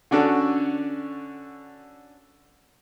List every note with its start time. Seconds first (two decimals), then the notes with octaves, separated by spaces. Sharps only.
0.11 D3 C#4 D4 F#4 A4